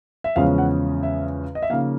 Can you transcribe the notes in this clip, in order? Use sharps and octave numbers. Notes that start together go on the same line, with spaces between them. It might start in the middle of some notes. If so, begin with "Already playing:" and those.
E5
E2 C#3 F3 G#3 C#4 F5
F#5
E5
D#5
E5
C#3 F3 A#3 D#4 F5